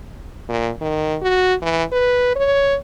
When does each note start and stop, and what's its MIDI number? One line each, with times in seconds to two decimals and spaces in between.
0.49 0.71 46
0.81 1.17 51
1.22 1.54 66
1.62 1.84 52
1.92 2.35 71
2.36 2.76 73